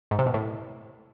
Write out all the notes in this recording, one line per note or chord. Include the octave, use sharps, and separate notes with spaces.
G#2
C3
B2
A2